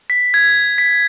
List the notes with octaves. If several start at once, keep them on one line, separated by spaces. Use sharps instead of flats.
B6
G#6
B6